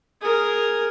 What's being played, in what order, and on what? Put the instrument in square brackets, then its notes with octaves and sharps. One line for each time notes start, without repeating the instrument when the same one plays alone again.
[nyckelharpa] G#4 A#4